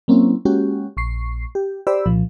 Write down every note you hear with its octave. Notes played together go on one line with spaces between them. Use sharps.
F#3 A#3 C4 C#4 E4
G#3 A#3 C#4 F#4 G4
A#1 C#6 C7
G4
G4 C5 D5 B5 E6
C2 A#2 F3